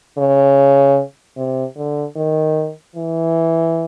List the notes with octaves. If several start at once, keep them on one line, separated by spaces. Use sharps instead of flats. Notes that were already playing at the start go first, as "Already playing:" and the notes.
C#3
C3
D3
D#3
E3